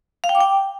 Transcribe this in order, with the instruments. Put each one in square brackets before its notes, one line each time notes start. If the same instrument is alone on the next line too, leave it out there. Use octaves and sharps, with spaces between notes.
[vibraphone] F5
G5
D6
G5